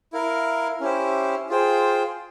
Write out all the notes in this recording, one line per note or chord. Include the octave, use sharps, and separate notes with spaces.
E4 A#4 F5
C#4 E4 G4 C5
F4 G#4 C5 G5